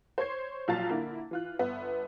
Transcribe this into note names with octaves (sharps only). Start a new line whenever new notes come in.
C5 C#5 C6 G#6 C7
A#1 A#2 F#3 F5 A5 A6
D3 A#3 E4
E3 F4 F#6
G1 B3 E5